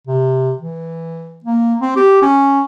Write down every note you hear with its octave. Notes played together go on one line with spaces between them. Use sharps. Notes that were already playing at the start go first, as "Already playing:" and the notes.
C3
E3
A#3
C4
G4
C#4